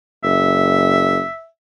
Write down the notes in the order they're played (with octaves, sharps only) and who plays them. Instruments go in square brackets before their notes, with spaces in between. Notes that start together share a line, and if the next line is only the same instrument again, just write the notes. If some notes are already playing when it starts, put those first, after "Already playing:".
[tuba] F#1 [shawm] E5